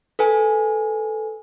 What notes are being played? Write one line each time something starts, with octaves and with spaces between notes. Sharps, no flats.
A4 B4 G#5